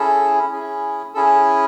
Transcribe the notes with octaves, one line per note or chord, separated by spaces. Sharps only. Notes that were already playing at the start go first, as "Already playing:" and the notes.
Already playing: C#4 E4 G#4 A4
C#4 E4 G#4
C#4 E4 G#4 A4